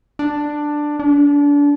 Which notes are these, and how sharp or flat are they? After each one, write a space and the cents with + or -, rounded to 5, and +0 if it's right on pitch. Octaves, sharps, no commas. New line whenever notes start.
D4 +10
D4 -30